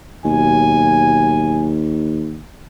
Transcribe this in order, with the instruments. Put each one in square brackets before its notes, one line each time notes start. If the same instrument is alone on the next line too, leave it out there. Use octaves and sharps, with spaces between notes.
[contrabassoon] D#2 [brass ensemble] B2 F#3 G#5